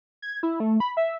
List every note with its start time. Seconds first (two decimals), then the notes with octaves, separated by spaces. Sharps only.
0.22 G#6
0.43 E4
0.60 A3
0.80 B5
0.97 E5